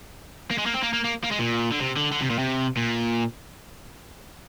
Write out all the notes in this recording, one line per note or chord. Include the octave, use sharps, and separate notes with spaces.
A#3
G#3
A#3
C4
A#3
A#3
A#3
A#3
G#3
A#2
D3
C3
D3
D3
C3
A#2
C3
A#2